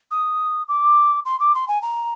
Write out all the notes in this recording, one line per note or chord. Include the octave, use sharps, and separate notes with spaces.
D#6
D6
C6
D6
C6
G#5
A#5